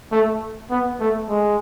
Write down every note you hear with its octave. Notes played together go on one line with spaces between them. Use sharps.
A3
B3
A3
G#3